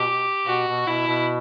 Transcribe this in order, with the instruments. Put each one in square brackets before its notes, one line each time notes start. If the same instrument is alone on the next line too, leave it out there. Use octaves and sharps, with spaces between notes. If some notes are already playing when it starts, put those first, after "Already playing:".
Already playing: [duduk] B2 [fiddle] G4
[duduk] B2 [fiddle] F#4
[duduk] B2
[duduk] B2 [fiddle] E4
[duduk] B2